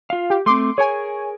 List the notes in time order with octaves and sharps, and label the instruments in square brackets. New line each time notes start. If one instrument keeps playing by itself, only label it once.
[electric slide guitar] F4 F5
[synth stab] G4
[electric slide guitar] A3 C4 [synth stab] C6 D6
[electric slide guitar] G#4 A#4 [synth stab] C#5 G#5